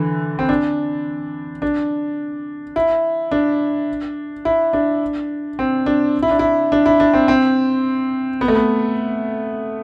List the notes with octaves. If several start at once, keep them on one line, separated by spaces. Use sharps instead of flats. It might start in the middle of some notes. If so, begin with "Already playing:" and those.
Already playing: D3 E3
C4
D4
D4
E4
D4
E4
D4
C4
D4
E4
D4
E4
D4
E4
D4
C4
C4
B3
A3
B3